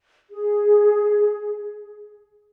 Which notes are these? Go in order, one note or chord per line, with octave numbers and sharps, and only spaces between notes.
G#4